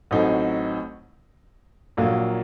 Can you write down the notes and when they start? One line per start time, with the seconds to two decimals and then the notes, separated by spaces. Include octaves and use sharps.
0.11 A1 A2 F#3 C4 D#4
1.97 A#1 A#2 F#3 A#3